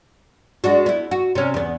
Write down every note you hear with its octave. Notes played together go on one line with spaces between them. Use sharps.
G#3 D4 F#4
B3 E4
F#4
C3 C#4
E2 B3